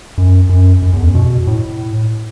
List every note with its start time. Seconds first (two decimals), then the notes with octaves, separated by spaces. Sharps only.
0.18 F#2
0.49 F#2
0.82 F#2
0.93 E2
1.04 F#2
1.15 B2
1.47 A2